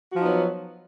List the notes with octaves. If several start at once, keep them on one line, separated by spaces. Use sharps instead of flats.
F3 F#3 B3 D#4 F#4